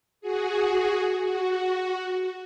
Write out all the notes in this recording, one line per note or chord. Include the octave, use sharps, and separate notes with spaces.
F#4 G#4
F#4